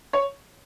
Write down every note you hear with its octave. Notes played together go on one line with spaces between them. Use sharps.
C#5